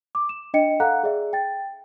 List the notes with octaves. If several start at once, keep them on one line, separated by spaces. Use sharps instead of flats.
D6
E7
D4 D#5 G5 C#7
A4 F5 F#5 A#5 F#6
G#4 D5 E5
G5 A6